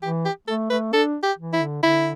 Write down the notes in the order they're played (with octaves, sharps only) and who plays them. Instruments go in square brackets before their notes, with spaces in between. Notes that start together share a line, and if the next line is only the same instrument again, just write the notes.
[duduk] E3 [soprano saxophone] G4
[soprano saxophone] G4
[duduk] A3 [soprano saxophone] A4
[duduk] A3 [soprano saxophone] B4
[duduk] D4 [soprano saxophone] A4
[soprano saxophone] G4
[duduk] E3
[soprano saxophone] E4
[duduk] D3
[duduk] D3 [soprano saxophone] E4